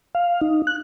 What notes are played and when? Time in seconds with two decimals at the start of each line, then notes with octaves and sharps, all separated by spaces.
0.15 F5
0.41 D#4
0.67 F#6